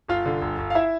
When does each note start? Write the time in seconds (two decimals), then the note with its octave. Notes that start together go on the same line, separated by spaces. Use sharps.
0.08 G1 F4 F5
0.26 D3
0.42 G1
0.58 G1
0.70 F5
0.75 E4 E5